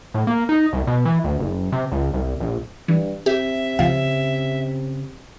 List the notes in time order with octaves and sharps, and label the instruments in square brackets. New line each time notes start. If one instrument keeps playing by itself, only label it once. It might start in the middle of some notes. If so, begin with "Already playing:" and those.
[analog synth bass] A2
A#3
D#4
C2
B2
E3
D2
F#1
C3
C#2
C2
A#1
[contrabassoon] G2 [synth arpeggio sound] E3
[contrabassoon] C3 [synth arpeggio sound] G4 [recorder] E5
[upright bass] C#3 [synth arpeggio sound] F3 F5